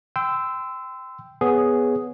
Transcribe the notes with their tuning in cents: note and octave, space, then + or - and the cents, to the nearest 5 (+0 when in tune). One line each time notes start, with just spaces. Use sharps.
G5 +0 C6 -30 E6 +0
B3 +0 G#4 +0 C#5 +10